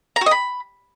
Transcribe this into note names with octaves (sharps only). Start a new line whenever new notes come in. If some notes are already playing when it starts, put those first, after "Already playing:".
A#5
F#4
D#5
B5